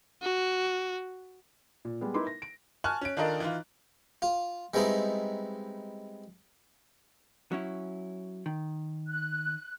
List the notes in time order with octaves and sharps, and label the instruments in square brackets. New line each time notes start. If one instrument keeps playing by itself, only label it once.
[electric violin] F#4
[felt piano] A#2
G3 G#3 B3
D#4 E4 A#4 B4 C6 D6
A#6
D7
[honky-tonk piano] G#5 A5 C#6 F6 F#6
C#4 D7
D#3 D4 F4 A4 A#4 D#5
E3 D#4 F4
[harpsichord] F4
G3 G#3 B3 C4 D#4 E4
[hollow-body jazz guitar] F#3 C#4 E4
D#3
[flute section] F#6